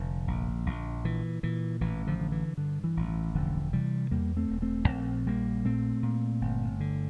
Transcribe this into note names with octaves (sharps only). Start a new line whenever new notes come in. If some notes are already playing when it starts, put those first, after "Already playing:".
Already playing: F1 D3
A#1
A#1
A#2 E3
A#2 E3
A1 E3
D3 F3
D3
E3
G2 D3
E3
A1
E3
E1 D3 F3
C3 E3 G3
E2 G3 A#3
A3 C4
E1
A3 C4
A#1 A3 C4
A#1 G3 A#3
A#2 A3 C4
A#2
G1
D3